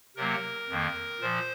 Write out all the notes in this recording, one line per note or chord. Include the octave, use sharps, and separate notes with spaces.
C3 F#3 A#3 A#4
F2 D#3 A#3
A#2 F3 C5